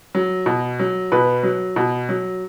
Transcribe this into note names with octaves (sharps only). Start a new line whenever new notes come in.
F#3
B2
F#3
B2 B4
F#3
B2
F#3